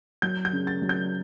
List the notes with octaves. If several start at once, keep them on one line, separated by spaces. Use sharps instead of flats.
F#3 G6
G6
C#3
A6
F#3
G6